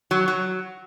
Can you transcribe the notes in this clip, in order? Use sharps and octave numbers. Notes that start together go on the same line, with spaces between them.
F#3
F#3